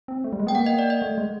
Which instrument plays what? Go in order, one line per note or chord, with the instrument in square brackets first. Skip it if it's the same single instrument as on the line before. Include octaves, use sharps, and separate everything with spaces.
[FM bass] C4
A3
G3
G#3
[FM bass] B3 [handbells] G5
[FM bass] A#3 [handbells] F#5
[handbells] D#5
D5
D#5
[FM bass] A3
G#3